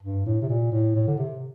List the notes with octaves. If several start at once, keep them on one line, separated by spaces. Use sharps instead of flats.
G2
A2
C3
A#2
A2
A2
D3
C3